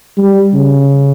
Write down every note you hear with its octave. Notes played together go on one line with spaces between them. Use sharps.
G3
C#3